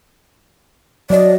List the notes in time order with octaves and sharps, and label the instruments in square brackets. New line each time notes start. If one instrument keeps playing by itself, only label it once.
[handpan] F#3 D#5 [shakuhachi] D5